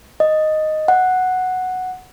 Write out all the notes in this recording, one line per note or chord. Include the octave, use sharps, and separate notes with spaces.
D#5
F#5